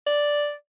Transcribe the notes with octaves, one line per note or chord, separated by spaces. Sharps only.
D5